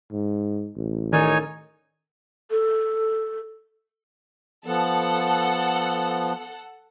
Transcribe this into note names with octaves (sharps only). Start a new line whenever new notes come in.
G#2
A1
D#3 D#4 A#4 C#5 G#5
A4
F3 B3 A4 F#5